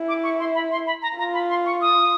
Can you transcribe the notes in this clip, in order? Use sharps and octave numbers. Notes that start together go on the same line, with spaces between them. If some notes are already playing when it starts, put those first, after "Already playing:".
Already playing: E4
D6
C#6
C6
B5
C6
B5
A#5
F4 A#5
B5
C6
C#6
D#6